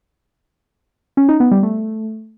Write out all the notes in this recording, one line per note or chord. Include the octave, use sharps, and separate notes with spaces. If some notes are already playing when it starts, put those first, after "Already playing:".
C#4
D#4
B3
G3
A3